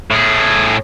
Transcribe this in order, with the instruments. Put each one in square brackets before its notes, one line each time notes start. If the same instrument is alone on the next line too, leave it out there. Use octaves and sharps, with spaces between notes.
[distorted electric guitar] A2 G#4